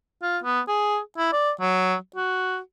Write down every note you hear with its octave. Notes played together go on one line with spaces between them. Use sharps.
F4
B3
G#4
E4
D5
F#3
F#4